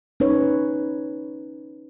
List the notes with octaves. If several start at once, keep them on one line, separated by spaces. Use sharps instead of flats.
C#4 D#4 B4 C#5